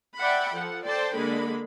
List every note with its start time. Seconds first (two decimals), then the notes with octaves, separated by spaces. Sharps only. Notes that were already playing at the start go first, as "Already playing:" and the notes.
0.20 D5 E5 F#5 G5 B5
0.54 F3 A4 F#5
0.84 A4 C5 D5 G5 A5
1.14 D3 G#3 A#3 B5